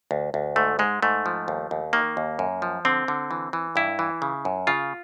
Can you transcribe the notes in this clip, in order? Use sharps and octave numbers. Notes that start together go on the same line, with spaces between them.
D2
D2
G#2 A3
G#2 G#3
G#2 A3
F3
D#2
D#2
D#3 A#3
D#2
F#2
F3
D3 C4
D3
E3
E3
G2 E4
E3
C#3
F#2
C#3 F4